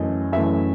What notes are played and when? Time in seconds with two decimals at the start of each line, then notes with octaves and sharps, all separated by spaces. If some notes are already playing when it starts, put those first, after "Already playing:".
Already playing: F#2 E3 A3 D#5
0.32 F#2 E3 A3 E5